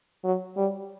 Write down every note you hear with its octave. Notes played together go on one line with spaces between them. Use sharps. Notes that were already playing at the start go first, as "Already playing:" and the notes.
F#3
G3